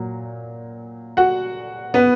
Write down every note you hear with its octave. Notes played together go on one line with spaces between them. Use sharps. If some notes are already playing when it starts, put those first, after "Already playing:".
Already playing: A#2 F#3
F#4 F#5
B3 B4